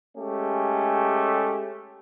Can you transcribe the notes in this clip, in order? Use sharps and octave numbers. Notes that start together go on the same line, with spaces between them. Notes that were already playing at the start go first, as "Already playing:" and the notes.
G#3 A3 C#4 G4